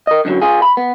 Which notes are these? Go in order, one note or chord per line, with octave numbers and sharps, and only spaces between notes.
A#4 D#5
F#2 D3 F3 F#3
F4 G#4
B5
B3